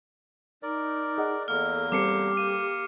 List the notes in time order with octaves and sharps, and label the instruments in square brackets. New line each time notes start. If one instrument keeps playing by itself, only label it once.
[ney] D#4 [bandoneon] A#4 D5
[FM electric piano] G#4 D#5 F#5
[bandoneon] E2 A#3 [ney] A4 [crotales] F6
[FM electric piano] G3 C4 A4 [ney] G4 [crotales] D6 C7 C#7
[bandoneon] A#3 [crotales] D#7